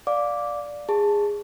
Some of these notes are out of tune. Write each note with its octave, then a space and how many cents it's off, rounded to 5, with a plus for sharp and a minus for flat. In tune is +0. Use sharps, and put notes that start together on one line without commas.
D5 +0 F5 +20 D6 -5
G#4 -15 A5 +0 C#6 -20